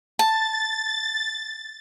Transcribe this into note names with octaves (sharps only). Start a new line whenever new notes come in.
A5 A6